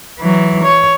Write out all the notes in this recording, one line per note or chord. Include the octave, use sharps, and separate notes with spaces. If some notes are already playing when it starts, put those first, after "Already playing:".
E3 F#3
C#5